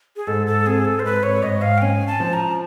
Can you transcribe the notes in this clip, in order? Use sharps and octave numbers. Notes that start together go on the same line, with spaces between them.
G#4
G#2 A4
A4
C4 G#4
A4
C5
G#2 B4
C#5
G#2 D#5
F5
G5
C#4 G#5
A5
F3
A#5